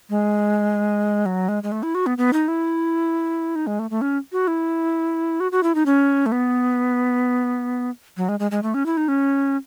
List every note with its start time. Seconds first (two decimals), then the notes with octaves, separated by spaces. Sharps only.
0.10 G#3
1.26 F#3
1.49 G#3
1.63 G#3
1.72 A3
1.83 E4
1.95 F#4
2.06 B3
2.18 B3
2.33 D#4
2.48 E4
3.56 D#4
3.67 G#3
3.79 A3
3.91 A3
4.01 C#4
4.32 F#4
4.47 E4
5.40 F#4
5.52 F#4
5.63 E4
5.75 D#4
5.86 C#4
6.26 A3
6.32 B3
8.17 F#3
8.29 G#3
8.40 G#3
8.51 G#3
8.63 A3
8.74 C#4
8.86 E4
8.97 D#4
9.08 C#4